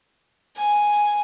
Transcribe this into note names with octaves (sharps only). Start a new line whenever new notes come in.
G#5